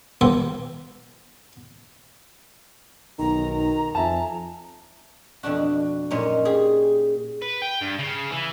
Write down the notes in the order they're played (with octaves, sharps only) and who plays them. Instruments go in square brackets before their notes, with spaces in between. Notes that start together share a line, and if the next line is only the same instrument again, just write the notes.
[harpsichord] B1 G2 D#3 A4 C6
[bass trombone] B1 [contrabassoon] D#3 [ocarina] A#5
[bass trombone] F2 [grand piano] E5 G#5 A5
[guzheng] F2 B2 D4 F#4
F#2 A#2 C#4 D#4
G4 G#4
[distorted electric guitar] B4
G5
G2
C#3
E3